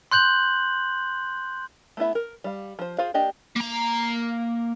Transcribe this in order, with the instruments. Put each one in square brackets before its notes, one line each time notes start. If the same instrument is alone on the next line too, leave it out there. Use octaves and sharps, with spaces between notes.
[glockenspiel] C6 F#6 G6 F#7
[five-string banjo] A3 B3 E4 E5
A#4
G3 F5
F3 C5
F4 G#4 C5 F5
A#3 D4 G4 D#5 G5
[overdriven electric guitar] A#3 A#5